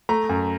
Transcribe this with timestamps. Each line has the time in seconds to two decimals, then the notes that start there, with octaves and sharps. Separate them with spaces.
0.09 A3 A#5
0.29 F#2